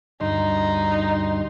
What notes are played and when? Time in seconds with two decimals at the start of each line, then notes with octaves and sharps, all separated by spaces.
0.21 D2 G2 D#4 C6